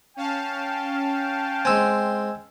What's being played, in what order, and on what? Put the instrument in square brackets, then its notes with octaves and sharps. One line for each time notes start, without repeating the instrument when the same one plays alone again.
[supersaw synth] C#4 F5 A5 [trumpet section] G5
[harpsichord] G#3 C4 [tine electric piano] G#5 E6